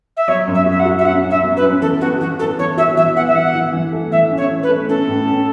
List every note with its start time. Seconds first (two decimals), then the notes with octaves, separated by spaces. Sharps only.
0.16 E5
0.28 F#3 C#5
0.48 F#2
0.54 E5
0.66 F#4 E5
0.79 F#5
0.86 F#4
0.98 E5
1.05 C#4 F#5
1.23 C#4
1.30 E5
1.43 F#3
1.56 B4
1.62 C#4
1.81 E3 A4
2.00 B3 F#4
2.20 E3 F#4
2.39 B3 A4
2.58 E3 C#5
2.77 F#4 E5
2.96 E3 E5
3.16 B3 F#5
3.27 E5
3.35 E3 F#5
3.54 E3
3.73 E3
3.92 A3
4.11 E3 E5
4.31 C#4
4.37 C#5
4.50 E3
4.62 B4
4.69 A3
4.88 C#4 A4
5.08 A2
5.27 C#4